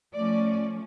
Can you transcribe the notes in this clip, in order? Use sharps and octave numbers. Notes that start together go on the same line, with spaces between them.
F3 A3 C#4 D5